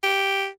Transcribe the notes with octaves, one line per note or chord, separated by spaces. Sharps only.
G4